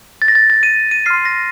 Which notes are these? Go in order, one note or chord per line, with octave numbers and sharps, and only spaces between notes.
A6
A#6
A6
A6
D#7
D#7
C6 F6 C7
A#6